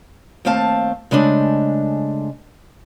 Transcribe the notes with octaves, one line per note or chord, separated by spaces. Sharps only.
D#2 A3 C4 F5 A5
C#3 G#3 A3 D4